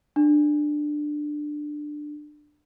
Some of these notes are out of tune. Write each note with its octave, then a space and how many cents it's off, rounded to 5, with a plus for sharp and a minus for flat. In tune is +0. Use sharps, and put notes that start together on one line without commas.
D4 +15